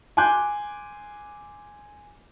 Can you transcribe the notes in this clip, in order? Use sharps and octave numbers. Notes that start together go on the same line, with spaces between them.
G#5 C6 D6 F#6 G6